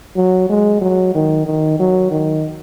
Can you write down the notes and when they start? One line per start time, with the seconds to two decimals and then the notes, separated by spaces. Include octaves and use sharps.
0.16 F#3
0.49 G#3
0.81 F#3
1.15 D#3
1.46 D#3
1.79 F#3
2.11 D#3